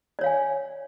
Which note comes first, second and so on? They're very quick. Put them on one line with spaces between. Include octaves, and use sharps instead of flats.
D5 C#5 F5 G#5